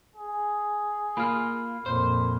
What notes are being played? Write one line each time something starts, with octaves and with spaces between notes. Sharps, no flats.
G#4
A#3 F4 B5 F6
F2 A#2 C5